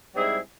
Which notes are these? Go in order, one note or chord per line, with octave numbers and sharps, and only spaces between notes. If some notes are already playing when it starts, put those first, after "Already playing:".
G#2 G3 C4 E4 G#4